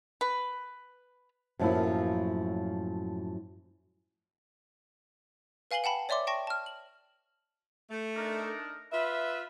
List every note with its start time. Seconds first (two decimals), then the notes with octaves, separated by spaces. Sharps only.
0.21 B4
1.59 F#2 A2 F3 F#3 A#3 E4
5.71 B4 F5 G#5 C7 F#7 G7
5.84 F#5 G5 A5 B5
6.09 C#5 D5 E5 C6 D6
6.27 G5 A5 C#6 A#6
6.47 A5 F6
6.66 F#7
7.91 A3
8.15 D4 D#4 A#4
8.92 F4 B4 E5